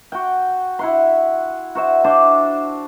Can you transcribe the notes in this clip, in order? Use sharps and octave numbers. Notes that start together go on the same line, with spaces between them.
F#4 G5
E4 F#5 C6
F#4 C5 E5
D4 C5 D5 E5